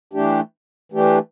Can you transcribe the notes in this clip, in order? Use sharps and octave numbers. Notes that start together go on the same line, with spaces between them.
E3 A3 D4 G4
E3 A3 D4 G4